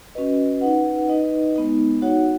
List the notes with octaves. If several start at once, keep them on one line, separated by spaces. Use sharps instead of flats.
C#4 F#4 B4 D#5
D#4 B4 F#5
D#4 B4 D#5
G#3 B3 D#4
D#4 F#4 C#5 F#5